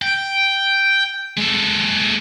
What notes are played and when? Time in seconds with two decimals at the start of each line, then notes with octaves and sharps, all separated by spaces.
0.02 G5
1.37 G#3 A4